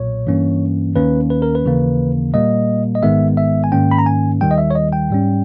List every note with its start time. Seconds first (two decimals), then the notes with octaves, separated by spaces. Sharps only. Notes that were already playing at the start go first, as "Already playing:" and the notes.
Already playing: B1 A#2 C#5
0.27 G2 E3 A#3 C#4
0.96 D#2 D#3 A#3 C#4 B4
1.30 B4
1.42 A#4
1.55 B4
1.65 D#2 C#3 E3 A#3
2.34 A#2 G3 A#3 D#5
2.95 D#5
3.03 G#1 G#2 D#3 G#3 B3 E5
3.37 E5
3.64 G#5
3.72 G#2 D#3 A#3 C#4 G5
3.91 B5
3.98 A#5
4.06 G#5
4.41 D#2 D#3 G3 G5
4.51 D#5
4.58 E5
4.71 C#5
4.75 D#5
4.92 G5
5.10 G#2 G3 C#4